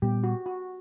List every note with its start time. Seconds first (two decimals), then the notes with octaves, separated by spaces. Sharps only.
0.02 A#2 G3 B3 G4
0.24 F#4
0.46 F#4